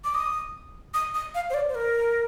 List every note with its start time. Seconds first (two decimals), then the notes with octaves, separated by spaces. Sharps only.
0.04 D6
0.14 D#6
0.94 D#6
1.14 D#6
1.35 F5
1.50 C5
1.54 D5
1.69 C5
1.75 A#4